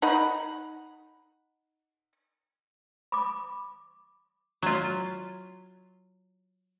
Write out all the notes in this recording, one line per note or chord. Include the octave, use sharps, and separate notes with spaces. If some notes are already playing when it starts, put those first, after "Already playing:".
D#4 F#5 B5
B5 D6
F#3 F4